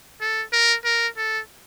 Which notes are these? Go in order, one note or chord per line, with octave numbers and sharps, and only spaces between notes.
A4
A#4
A#4
A4